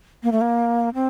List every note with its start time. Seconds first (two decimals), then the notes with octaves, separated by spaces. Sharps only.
0.23 A#3
0.32 A3
0.41 A#3
0.94 C4